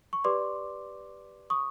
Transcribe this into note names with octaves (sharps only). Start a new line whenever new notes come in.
C#6
G4 B4 D5 C6 D6
C#6 D#6